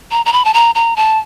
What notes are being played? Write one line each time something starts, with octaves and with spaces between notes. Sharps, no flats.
A#5
A#5
B5
A5
A#5
A#5
A5